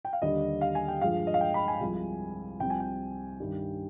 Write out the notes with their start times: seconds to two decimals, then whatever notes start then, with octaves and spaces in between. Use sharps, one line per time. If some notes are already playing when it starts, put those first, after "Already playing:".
0.05 G5
0.13 F5
0.22 D#2 D3 G3 D#5
0.61 F5
0.75 G#5
0.88 G5
1.01 G2 F3 G#3 F5
1.27 D#5
1.34 F5
1.41 G5
1.54 B5
1.68 G#5
1.80 C2 C3 F3 G#3
2.60 C2 C3 F3 G5
2.70 G#5
2.80 G5
3.40 G2 D#3 G3